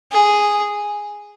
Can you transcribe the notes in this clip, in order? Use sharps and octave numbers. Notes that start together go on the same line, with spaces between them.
G#4